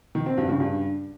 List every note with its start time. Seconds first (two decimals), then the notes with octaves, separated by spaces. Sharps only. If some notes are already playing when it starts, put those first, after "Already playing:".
0.15 D#3
0.26 C4
0.37 G2
0.49 C#3
0.60 G2